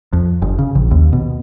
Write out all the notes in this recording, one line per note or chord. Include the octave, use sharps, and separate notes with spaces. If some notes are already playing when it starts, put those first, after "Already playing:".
F2
F#1
C#3
A#1
D#2
B2